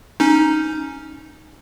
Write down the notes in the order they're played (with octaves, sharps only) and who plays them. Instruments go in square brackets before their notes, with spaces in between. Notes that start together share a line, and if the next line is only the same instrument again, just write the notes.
[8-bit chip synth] C#4 D#4